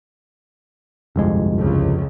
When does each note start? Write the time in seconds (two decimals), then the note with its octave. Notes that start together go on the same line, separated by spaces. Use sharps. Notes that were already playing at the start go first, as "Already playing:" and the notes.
1.16 G1 C2 F2 G#3
1.59 C#2